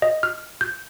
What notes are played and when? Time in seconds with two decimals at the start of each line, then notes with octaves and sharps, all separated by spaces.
0.02 D#5
0.23 F6
0.61 G6